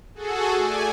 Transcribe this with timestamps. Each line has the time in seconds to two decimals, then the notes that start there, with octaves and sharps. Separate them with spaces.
0.15 F#4 G#4 A4
0.55 A3 D5 G#5